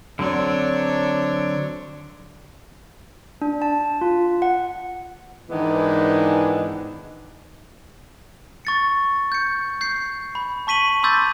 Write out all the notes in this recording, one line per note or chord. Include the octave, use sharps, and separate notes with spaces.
D3 F#3 C4 D4 C#5
D4
A5
F4
F#5
G#2 D#3 E3 G#3 B3 D4
C#6 A6 C#7
G6 C#7
G6 C7
B5
A5 C#6 B6 D#7 F#7
B5 C6 D6 E6 G6 A6